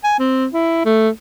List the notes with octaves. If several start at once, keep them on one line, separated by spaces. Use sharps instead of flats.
G#5
C4
E4
A3